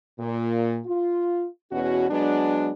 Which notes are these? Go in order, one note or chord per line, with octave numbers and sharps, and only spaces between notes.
A#2
F4
E2 B2 C#4 F#4
F#3 G#3 B3 D4